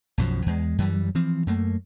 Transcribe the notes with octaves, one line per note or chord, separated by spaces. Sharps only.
B1 F#2 B2 F3
E2 G#3
F#2 E3 G3
E3 F3 C4
F#2 A3 A#3